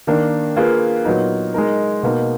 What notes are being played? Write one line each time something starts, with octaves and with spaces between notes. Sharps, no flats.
D#3 A#3 D4
A#3 F4 G#4 B4
A#2 F#3 B3 D#4
G#3 D#4 A#4
B2 A#3 D#4